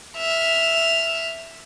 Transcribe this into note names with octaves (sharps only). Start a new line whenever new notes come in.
E5 F6